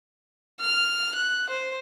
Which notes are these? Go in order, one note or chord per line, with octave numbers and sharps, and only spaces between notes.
F6
F#6
C5